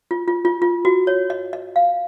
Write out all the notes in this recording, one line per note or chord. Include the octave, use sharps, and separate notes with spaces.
F4
F4
F4
F4
F#4
C#5
D#5
D#5
F5